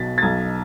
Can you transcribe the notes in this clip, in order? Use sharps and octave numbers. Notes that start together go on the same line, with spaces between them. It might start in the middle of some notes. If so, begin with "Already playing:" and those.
Already playing: B1 B2 A6 B6
A6
B1 G#6